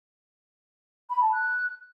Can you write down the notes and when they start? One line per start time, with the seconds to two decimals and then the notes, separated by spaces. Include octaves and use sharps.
1.10 B5
1.21 A5
1.32 F#6